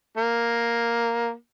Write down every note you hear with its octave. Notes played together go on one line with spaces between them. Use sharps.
A#3